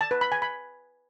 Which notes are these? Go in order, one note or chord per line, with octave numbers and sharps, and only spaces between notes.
A5
B4
B5
G#5
B5